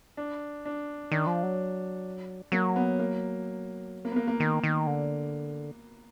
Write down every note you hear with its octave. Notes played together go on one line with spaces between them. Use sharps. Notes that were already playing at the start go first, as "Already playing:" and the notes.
D4
D4
D#3 D4
F3
F#3
F#3 A#3
B3
A#3
A#3
B3
A#3
A#3
D#3
D#3
D3